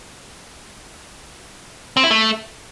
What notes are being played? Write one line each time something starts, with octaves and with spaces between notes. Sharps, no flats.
C4
E4
A3